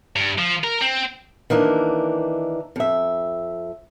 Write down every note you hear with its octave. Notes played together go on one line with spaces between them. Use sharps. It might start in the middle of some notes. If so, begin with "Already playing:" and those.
G2
F3
A#4
C4
D#3 E3 A#3 D4
F2 E5